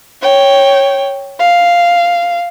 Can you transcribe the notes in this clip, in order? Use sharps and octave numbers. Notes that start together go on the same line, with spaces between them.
C#5 G5
F5